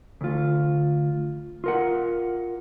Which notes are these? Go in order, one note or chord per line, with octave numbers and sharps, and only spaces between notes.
D2 F4
F4 A#4 F#5